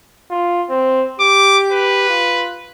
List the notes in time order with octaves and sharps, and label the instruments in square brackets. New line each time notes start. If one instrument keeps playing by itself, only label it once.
[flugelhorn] F4
C4
[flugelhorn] G4 [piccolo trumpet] D6
[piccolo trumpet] B4
[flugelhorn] F4